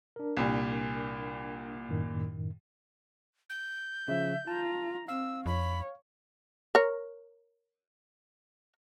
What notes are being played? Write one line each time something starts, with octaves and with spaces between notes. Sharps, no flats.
D4 A#4
C2 A#2
F#2 A2 D#3
G6
C#3 F3 E5
F4 A5 A#5
C4 F5 E6
F2 C#5 B5
A#4 C#5